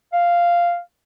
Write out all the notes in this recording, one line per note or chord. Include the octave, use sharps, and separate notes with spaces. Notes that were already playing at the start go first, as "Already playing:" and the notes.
F5